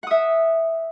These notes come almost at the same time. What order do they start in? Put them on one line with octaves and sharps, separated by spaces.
F#5 D#6 E5